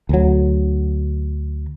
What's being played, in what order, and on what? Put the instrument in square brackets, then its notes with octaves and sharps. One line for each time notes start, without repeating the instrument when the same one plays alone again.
[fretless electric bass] D2 F#3